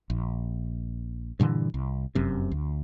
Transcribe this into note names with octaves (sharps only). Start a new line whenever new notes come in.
A#1
G2 A#2 D3 E3
C2
F1 F#2 C3
D2